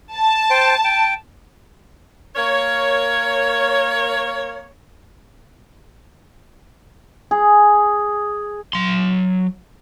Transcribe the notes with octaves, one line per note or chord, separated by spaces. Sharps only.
A5
C5 G5
G5
A#3 A#4 C#5
G#4
F#3 C6